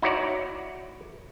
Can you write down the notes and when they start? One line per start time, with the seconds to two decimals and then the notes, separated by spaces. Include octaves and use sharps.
0.02 D#4 E4 F#4 C#5 D5